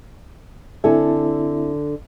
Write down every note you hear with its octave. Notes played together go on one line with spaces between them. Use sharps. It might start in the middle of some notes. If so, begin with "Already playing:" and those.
D3 C4 E4 A4 E5 G#5